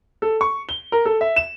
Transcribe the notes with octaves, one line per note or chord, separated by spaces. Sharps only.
A4
C#6
G7
A#4
A4
E5
E7